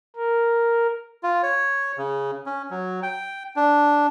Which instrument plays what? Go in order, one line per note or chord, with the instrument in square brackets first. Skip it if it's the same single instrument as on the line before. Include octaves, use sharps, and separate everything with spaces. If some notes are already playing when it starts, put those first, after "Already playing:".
[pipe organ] A#4
[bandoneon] F4
C#5
C#3
C#4
F#3
G5
D4